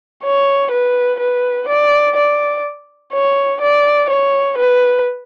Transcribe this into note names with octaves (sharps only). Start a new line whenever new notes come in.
C#5
B4
B4
D5
D5
C#5
D5
C#5
B4